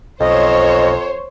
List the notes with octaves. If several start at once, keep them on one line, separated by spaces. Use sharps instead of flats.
B1 F2 C5 C#5 D#5